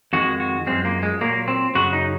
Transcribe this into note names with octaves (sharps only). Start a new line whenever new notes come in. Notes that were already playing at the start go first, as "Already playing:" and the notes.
F2 D#3 G#3 F#4
F#4
F#2 F3 G#3 C4
A#3
G#3
A#2 F#3 A#3
C4
F#2 C#3 F#3 F#4
D#4